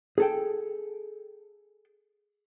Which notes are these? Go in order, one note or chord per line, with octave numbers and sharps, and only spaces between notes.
G#4 A4 G5